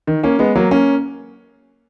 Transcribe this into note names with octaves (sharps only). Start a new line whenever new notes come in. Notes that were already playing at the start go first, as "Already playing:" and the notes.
D#3
A#3 C#4
G#3 B3
F#3 A#3
A#3 C#4